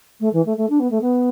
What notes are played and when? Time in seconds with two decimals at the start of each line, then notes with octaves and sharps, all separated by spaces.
0.20 A3
0.33 E3
0.46 A3
0.57 A3
0.70 D4
0.80 B3
0.91 A3
1.01 B3